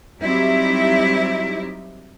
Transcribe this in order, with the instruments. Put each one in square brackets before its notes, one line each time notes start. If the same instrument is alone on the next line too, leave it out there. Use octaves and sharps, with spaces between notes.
[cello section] F#3 G3 C4 D#4 E4 G4